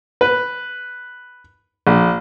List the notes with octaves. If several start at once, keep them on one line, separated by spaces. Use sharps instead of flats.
B4
A#1